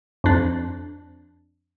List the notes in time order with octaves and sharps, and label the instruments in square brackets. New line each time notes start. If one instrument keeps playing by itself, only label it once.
[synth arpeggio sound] F2 D4